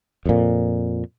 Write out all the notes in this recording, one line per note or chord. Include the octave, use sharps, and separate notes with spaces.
F2 A#2